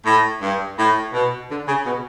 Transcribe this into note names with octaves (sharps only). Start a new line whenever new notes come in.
A2
G2
A2
B2
D3
C#3
B2